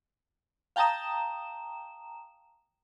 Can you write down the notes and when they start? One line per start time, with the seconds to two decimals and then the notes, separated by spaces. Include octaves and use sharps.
0.76 F5 G5 A5 A#5 D#6 E7